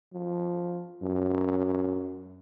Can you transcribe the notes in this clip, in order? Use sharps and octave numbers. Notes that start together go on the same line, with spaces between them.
F3
F#2